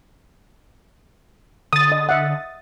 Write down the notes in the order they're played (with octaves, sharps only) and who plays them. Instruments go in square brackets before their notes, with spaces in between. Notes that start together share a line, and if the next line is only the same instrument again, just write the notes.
[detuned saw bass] D3 [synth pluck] D#6 A6
[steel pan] D#5
E5 F#5